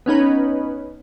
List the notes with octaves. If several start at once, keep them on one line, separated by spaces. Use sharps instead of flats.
B3 C#4 D#4 B4